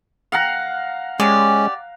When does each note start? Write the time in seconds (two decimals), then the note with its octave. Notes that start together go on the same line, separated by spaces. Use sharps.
0.32 F5 F#5 A#5
1.20 G#3 C#4 G4 D5